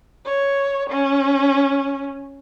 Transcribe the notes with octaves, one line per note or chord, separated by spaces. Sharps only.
C#5
C#4